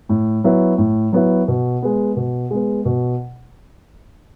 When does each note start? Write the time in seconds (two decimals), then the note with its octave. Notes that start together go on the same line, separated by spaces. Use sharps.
0.09 A2
0.44 F#3 B3 E4
0.78 A2
1.13 F#3 B3 E4
1.48 B2
1.82 G#3 B3
2.16 B2
2.51 G#3 B3
2.85 B2